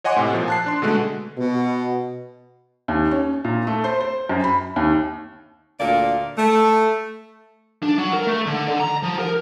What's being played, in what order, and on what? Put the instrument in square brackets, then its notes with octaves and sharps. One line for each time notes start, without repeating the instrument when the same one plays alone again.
[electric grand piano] C#5 D#5 F#5 G#5 C6 D6
A2 C3
A#2 F3
A5 F#6 C7
D4 C6
B2 D3 G#3 A3
[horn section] B2
[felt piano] D#2
C#4
A#2
A3
C5
C5
F#2
B5
D#2
[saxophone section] D2 A#2 A#3 D5
A3
[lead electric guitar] D4
F#3
A#4
A3
D3
D3
A#5
F3
A#4